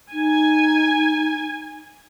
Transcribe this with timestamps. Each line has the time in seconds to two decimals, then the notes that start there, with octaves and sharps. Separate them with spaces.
0.13 D#4 G#5